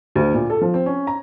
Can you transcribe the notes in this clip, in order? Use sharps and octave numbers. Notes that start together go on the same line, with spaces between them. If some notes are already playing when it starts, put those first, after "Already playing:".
D2
A#2
A4
F3
C4
C#4
A#5